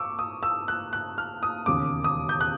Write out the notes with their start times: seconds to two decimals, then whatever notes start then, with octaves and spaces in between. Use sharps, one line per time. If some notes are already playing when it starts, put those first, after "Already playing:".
Already playing: C#6 D6 E6
0.19 D#6
0.43 E6
0.68 F#6
0.93 F#6
1.18 F6
1.43 D#6
1.66 E1 D#2 C#3 D6
2.04 D#6
2.29 G6
2.41 F#6